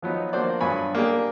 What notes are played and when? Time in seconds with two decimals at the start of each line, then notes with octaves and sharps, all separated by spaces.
0.02 F3 F#3 B3 D#4
0.33 F3 A#3 D4 F#4 C5 D5
0.60 G2 F#3 B3 G#5 B5 C#6
0.95 A#3 D4 G4 G#4 G5